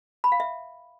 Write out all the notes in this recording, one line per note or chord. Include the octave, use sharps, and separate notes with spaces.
B5
F5
E5